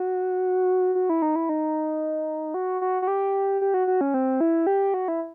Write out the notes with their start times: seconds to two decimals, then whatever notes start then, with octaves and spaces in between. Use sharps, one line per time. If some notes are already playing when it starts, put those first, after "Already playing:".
Already playing: F#4
0.95 F#4
1.09 E4
1.22 D#4
1.36 E4
1.49 D#4
2.54 F#4
2.81 F#4
3.02 F#4
3.07 G4
3.61 G4
3.74 F#4
3.87 F#4
4.01 C#4
4.14 C4
4.41 E4
4.67 G4
4.94 F#4
5.08 E4